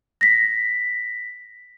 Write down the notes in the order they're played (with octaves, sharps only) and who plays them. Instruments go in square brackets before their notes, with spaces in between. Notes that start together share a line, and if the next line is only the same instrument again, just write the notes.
[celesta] A#6 B6